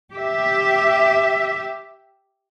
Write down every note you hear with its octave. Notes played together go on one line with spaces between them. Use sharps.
G4 E5